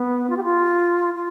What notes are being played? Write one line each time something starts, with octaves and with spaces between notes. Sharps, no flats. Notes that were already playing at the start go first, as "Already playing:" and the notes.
Already playing: B3
F4
G4
F4
F4